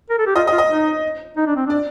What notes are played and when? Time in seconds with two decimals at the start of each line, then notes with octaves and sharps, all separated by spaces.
0.10 A#4
0.18 A4
0.27 G4
0.36 F4 D#5
0.47 D#5
0.52 F4
0.58 D#5
0.70 D#4
1.37 D#4
1.47 D4
1.56 C4
1.67 D4 D5